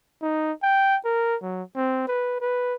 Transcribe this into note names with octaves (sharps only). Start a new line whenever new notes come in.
D#4
G5
A#4
F#3
C4
B4
B4